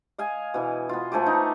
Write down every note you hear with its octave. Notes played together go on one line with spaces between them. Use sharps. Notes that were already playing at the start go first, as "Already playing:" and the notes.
D#5 F5 G#5
B2 E3
B3 F4
F3 A3 G#5 D6
D#4